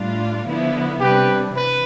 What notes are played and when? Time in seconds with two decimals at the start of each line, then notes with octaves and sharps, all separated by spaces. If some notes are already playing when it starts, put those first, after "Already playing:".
Already playing: A2 G3 D4 F4
0.46 D3 F3 B3 E4
1.00 C3 G3 D4 G4 B4
1.55 E3 B4